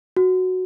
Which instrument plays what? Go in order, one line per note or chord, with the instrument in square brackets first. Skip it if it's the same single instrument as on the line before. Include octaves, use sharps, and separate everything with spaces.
[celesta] F#4